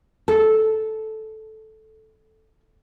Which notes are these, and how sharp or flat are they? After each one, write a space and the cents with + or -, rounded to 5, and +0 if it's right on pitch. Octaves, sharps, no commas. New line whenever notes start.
A4 -10